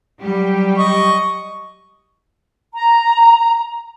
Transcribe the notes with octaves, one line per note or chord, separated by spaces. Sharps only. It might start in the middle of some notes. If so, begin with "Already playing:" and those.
F#3 G3 G4
D#5 C#6
A#5